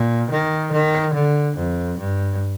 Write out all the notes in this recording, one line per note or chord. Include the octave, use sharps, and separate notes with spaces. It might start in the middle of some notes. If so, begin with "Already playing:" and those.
Already playing: A#2
D#3
D#3
D3
F2
G2